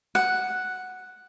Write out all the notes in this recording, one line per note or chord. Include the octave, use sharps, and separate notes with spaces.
F#5